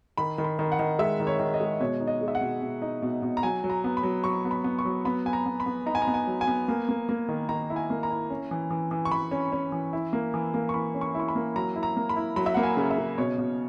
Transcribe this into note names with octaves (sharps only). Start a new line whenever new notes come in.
D#3 B5
D#3
B5
D#3
F#5
D#3
G#3 E5
D#3
C#5
D#3
D#5
G#3
B2 C#5
D#4
D#5
G#3
E5
F#5
B2
B2
D#4
B2
B2
A#5
F#3 G#5
F#3
A#5
B3
B5
F#3
F#3 C#6
B3
B5
B3
C#6
F#3
B3 B5
B3 G#5
A#5
B3
B5
B3
D#4 A#5
G#5
A#5
B3
G#5
F#3
G#5
B3
A#3
A#3
A#3
D#3
D#3 A#5
E4
G#5
A#3
A#5
E4
C#4
E3
E3
E3
C#6
E3 B5
C#4
C#4
E3
E4
A#3
E3
A#3
C#6
E3 B5
C#4
C#6
E4 C#6
B5
A#3
F#3 A#5
E4
A#5
A#3
B5
E4
F#3 B5
E5
A#3 F#5
G#5
C#3
E5
C#3
B2 C#5
B2